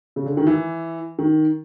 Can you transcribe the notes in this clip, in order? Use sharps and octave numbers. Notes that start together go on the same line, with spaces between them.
C#3
D3
D#3
E3
D#3